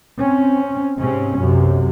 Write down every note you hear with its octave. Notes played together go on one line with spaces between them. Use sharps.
C4 C#4
G#2 C3 C4 C#4
B1 F#2 C3